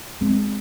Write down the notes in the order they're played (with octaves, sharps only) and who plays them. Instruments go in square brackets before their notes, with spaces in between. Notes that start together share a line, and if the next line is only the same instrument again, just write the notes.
[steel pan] G#3 [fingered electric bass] C4